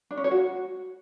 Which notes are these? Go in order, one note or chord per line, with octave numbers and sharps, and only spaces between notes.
D4
C#4
C#5
F#4